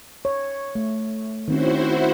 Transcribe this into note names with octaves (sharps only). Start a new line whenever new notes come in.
C#5
A3
D#3 C4 C#4 E4 F#4 C5